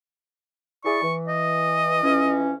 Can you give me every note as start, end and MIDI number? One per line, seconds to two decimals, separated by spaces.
0.84 0.99 64
0.84 0.99 68
0.84 0.99 74
0.84 1.14 85
1.02 1.99 52
1.28 2.42 75
2.03 2.51 41
2.03 2.51 52
2.03 2.51 61